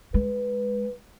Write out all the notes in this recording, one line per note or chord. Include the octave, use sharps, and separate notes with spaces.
G#3 B4